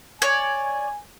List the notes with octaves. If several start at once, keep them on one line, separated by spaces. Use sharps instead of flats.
C#5 D5 G#5